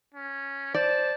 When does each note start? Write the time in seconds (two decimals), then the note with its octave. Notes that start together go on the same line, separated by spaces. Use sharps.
0.14 C#4
0.74 C5 D5 A5